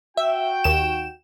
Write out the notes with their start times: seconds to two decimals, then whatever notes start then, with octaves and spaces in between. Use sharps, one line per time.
0.17 F#4 E5 G5
0.64 D#2 E7